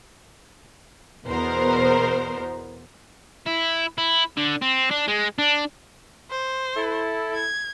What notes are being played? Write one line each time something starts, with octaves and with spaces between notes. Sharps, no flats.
E2 B2 B3 A#4 C5
E4
E4
D3
C4
D4
G#3
D4
C5
E4 A4
G#6